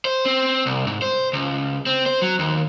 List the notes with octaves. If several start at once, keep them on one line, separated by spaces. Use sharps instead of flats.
C5
C4
C2
G#2
C5
C#2
C4
C5
F#3
D#2